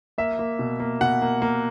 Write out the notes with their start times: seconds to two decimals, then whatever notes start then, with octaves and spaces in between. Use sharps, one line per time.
0.18 A#3 E5
0.39 A#3
0.59 B2
0.80 A#3
1.01 B2 F#5
1.22 A#3
1.42 A#3